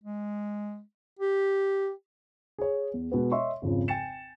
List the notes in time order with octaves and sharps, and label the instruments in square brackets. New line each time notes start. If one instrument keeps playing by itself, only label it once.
[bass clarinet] G#3
G4
[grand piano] G#4 C#5
E2
B2 G#3 B3
C#5 D#5 E5 C6 C#6
G#1 F2 C#3 F3
G5 G#5 A6 C#7 E7